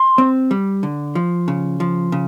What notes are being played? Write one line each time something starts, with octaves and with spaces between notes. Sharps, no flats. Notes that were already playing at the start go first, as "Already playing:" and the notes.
Already playing: C6
C4
G3
D3
F3
C#3
F3
C#3